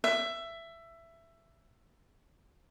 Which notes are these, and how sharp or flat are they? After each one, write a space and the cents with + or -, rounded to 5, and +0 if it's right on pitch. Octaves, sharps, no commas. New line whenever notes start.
E5 +15